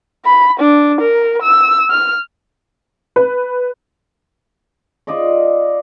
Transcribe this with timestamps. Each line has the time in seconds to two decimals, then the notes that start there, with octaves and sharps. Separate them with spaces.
0.26 B5
0.60 D4
1.01 A#4
1.42 E6
1.91 F6
3.16 B4
5.07 F4 D5 D#5 C#6